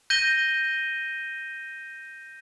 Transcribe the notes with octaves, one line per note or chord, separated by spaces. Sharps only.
G6 A#6 D#7 G7